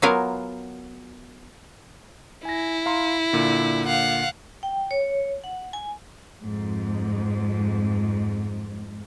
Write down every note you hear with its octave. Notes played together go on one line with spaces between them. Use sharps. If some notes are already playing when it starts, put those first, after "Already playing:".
F#3 B3 F4 A#4 G#5
E4 G#5 A#6
F5 A#5 C6
A#2 D3
F5 F#5
G5
C#5
F#5
G#5
F2 G#2